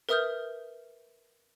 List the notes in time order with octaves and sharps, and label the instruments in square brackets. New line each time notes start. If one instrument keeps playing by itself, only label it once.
[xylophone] A#4 B4 E5 D#6 F6 G6